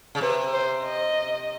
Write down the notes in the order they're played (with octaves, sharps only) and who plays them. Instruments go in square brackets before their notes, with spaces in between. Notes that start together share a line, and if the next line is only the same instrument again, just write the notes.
[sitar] C#3
[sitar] C3 [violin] B4
[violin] C5
D#5